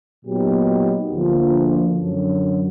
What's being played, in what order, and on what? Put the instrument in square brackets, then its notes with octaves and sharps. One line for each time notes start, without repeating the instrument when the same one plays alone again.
[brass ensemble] A#2 F#3 B3 D#4 G4
D2 D3 F3 A#3
F#2 D3 F#3